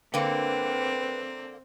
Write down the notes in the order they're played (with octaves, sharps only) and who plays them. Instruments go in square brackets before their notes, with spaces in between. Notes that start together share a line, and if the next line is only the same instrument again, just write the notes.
[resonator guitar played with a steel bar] D3 A#3 [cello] C4 [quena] B4 [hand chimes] G5